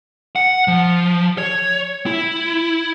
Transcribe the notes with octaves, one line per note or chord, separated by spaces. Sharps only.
F#5
F3
C#5
E4